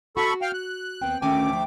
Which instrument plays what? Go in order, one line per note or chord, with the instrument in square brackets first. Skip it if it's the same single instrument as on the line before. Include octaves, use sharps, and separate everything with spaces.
[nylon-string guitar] F#4 [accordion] A4 B5 C#6
[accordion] F5 G5 F6
F#6
[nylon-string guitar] D#2 B3 C4 [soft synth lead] G5
[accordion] D2 A3 D6 [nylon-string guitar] D#3 C#4 G#5
[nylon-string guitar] F3